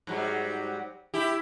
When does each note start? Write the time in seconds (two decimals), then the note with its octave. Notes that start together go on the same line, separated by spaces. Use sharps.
0.07 G#2 F#3 G3
1.14 E4 G4